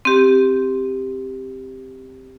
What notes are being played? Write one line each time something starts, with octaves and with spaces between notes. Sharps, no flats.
C4 G4